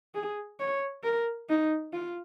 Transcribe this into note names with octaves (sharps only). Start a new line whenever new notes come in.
G#4
C#5
A#4
D#4
F4